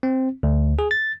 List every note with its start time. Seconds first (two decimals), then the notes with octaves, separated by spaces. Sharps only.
0.03 C4
0.43 D2
0.79 G#4
0.91 A6